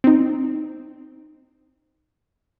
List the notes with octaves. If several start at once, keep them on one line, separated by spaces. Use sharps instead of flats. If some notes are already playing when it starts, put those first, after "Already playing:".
C4 D#4